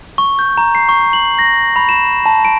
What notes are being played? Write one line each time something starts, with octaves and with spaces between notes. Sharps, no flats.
C#6
G6
A#5
C7
C#6
F#7
A#6
B5
E7
A5
D7